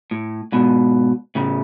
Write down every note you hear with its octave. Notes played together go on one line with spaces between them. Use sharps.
A2
G#2 B2
A2 C#3